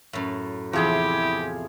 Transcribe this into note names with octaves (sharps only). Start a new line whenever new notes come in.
F#2 A2
E2 C3 F3 E4 G4 G#4 G5